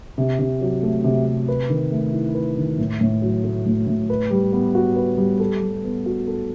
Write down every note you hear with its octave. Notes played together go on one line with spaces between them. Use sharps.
C3
C3
F#3
A3
C3
C3
B4
D#3
A3
E4
B4
D#3
A2
A2
F#3
A3
A2
A2
B4
G3
B3
F#4
B4
G3
A4
G3
B3
F#4
A4